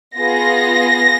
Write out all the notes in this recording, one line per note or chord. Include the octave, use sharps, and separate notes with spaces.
B3 F4 G#4 A#6